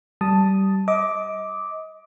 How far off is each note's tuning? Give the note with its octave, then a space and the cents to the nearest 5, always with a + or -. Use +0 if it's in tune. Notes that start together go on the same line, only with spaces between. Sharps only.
G3 -20 A5 +0 D#6 +0
D#5 +30 D6 +0